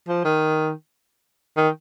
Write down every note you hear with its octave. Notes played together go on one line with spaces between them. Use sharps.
F3
D#3
D#3